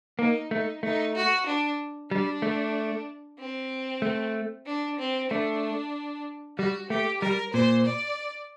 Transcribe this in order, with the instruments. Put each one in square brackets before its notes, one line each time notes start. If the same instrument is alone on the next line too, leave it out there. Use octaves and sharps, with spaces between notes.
[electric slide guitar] A#3 [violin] D#4
[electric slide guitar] A3 [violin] D#4
[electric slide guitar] A3 [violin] D#4
[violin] F#4
D4
[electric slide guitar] G3 [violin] D4
[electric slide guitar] A3
[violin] C4
[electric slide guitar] A3
[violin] D4
C4
[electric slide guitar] A3 [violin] D4
[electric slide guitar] G3 [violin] F#4
[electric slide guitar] A3 [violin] G4
[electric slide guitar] G3 [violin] A#4
[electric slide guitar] A#2 [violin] C5
[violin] D5